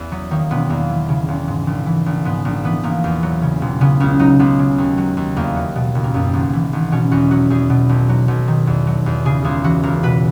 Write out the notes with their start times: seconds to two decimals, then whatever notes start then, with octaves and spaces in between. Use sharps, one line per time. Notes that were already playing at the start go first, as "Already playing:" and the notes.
Already playing: E2
0.11 F#3 B3
0.31 D#3 A#3
0.50 E1 B3
0.70 E2 A#3
0.90 E3
1.09 C#3
1.28 E1
1.48 G#2
1.67 A#1
1.86 E3
2.06 A#1
2.25 G#2 B3
2.45 A#1 A#3
2.64 E3 B3
2.83 A#1 A#3
3.04 E2
3.23 F#3
3.42 C#3
3.62 E1
3.81 C#3 B3
4.00 C#2 C#4
4.19 F#3 D#4
4.39 C#2 B3
4.59 C#3
4.78 D#2
4.98 F#3
5.17 D#2
5.36 E2 A#3
5.56 F#3
5.76 B2
5.95 F#1
6.04 A#3
6.14 F#2 B3
6.33 G#1
6.53 E3
6.73 G#1
6.92 B2 C#4
7.11 E2 F#4
7.31 F#3 F#4
7.50 E2 G#4
7.70 B2
7.89 B1
8.09 F#3
8.28 B1
8.48 D#3
8.67 E2
8.87 F#3
9.06 E2
9.25 C#3 G#4
9.44 C#2 G#4
9.64 E3 F#4
9.83 C#2 A#4
10.03 B2 B4